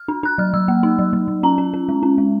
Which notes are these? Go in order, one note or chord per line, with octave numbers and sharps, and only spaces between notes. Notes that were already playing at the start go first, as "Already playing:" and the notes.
Already playing: F6
D4
D4 F#6
F#3 F6
F#3 E6
A#3
D#4
F#3
F#3
F#3
C#4 A#5
C#4
C#4
G#3
C#4
G#3